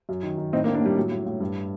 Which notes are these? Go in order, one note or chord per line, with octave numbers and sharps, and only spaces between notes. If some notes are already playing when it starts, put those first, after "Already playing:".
F#2
D#3
D#3
A2 C4 D#4
A#3 D4
A2
A#3 D4
A2 G3
A2 F#3
A2
A2
G2